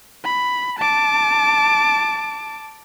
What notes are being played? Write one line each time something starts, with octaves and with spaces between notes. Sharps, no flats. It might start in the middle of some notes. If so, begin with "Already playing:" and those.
B5
A5 D6